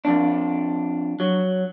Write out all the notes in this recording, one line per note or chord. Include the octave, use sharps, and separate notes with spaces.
F2 D4
F#3